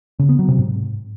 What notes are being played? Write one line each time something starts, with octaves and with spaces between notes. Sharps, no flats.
C#3
B3
F#3
C3
G#2